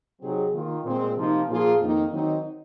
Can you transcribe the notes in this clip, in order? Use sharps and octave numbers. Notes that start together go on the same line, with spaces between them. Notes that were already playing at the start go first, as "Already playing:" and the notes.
C3 F#3 C4 D#4 G#4
D#3 A#3 F4
A#2 G#3 C4
C3 F3 A#3 D#4
A#2 F3 A#3 F4 G#4
F2 D#3 A#3 D#4
D#3 F#3 C4 D#4